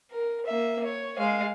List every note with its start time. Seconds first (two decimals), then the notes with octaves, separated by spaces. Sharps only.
0.11 A#4
0.46 A#3 E5
0.84 C#5
1.18 G#3 F5